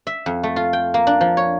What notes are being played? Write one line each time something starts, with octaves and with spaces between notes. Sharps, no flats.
E5
F2
A3
F4
G5
A#3
D4
F3
C#5